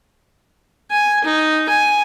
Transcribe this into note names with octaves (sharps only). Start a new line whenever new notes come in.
G#5
D#4
G#5